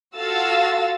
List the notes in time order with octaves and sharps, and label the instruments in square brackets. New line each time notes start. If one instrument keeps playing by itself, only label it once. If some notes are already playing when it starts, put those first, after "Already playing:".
[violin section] F4 F#4 A4 F5 E6 A6